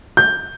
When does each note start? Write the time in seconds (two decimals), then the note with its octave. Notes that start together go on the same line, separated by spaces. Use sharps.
0.17 G6